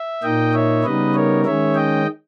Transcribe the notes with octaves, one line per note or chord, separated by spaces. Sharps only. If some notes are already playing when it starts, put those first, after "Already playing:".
Already playing: E5
A#2 A#3 D#4 D#5 G5
C#5 E5
C#3 G3 B3 D#4 B4 D#5
A#4 C#5
D#3 G#3 C#4 C#5 E5
D#5 G5